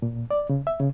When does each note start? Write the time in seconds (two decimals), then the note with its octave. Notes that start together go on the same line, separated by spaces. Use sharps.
0.02 A#2
0.31 D5
0.49 C#3
0.67 E5
0.80 C#3